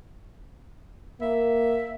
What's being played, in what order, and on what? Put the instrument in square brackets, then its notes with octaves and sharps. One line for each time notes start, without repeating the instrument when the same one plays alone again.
[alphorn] A#3 [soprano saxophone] E5